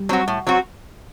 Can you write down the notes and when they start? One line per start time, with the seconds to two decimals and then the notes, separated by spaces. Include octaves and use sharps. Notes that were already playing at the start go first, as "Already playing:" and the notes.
Already playing: G3
0.09 F#3 C4 F#4
0.28 A2
0.47 F#3 C4 F#4